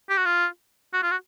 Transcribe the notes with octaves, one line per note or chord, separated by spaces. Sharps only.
G4
F#4
F4
F#4
F4
F#4